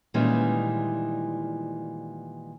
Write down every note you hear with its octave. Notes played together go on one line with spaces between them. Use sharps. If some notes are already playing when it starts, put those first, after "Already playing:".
A#2 D#3 E3 G3 G#3 C#4